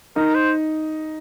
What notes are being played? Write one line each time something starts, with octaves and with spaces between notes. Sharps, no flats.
D#4 A#4
C5